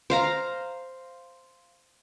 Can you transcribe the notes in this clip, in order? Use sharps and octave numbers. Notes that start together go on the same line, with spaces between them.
C5 F5 A#5